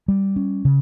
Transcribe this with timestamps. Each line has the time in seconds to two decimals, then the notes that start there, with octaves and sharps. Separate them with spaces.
0.08 G3
0.36 C#4
0.65 C#3